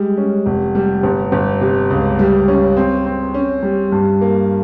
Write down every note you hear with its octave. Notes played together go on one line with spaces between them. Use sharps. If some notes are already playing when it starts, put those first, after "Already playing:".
Already playing: G3 G#3
C#4
F1
G3
G1
G1
C3
C#2
G3
C#4
C4
C4
C#4
G3
G2
A#3